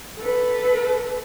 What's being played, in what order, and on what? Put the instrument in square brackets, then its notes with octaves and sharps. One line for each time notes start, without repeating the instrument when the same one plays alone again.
[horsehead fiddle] A4 B4